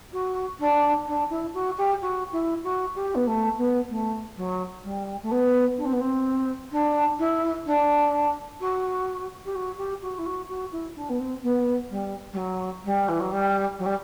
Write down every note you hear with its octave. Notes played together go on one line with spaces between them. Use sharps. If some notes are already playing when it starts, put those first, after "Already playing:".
F#4
D4
D4
E4
F#4
G4
F#4
E4
F#4
G4
B3
A3
B3
A3
F#3
G3
A3
B3
D4
C4
B3
C4
D4
E4
D4
F#4
G4
F#4
G4
F#4
E4
F#4
F#4
E4
D4
B3
C4
B3
G3
G3
F#3
G3
E3
F#3
G3
F#3
G3